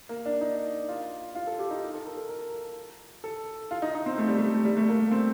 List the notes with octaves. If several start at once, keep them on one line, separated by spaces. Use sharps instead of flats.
A#3
D4
D#4
F4
F4
A4
G4
D#4
F4
A4
A#4
A4
A#4
A4
F4
D#4
D#4
C4
A3
G3
A3
G3
A3
A#3
A#3
C4